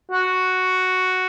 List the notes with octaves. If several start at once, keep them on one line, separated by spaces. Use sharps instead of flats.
F#4